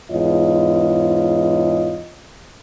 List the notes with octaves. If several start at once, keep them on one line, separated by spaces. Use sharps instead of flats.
E2 G#2 F4 C#5 D#5